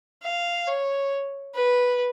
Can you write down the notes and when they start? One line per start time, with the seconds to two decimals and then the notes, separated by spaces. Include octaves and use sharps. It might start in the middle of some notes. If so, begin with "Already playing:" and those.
0.23 F5
0.68 C#5
1.55 B4